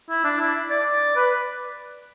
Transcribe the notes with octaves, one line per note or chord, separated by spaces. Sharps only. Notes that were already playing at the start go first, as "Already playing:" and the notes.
E4
D4
E4
D5
B4